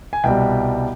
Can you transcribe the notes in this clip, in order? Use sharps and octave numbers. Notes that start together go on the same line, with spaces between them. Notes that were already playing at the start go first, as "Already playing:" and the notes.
G#5
C2 B2 G3 G5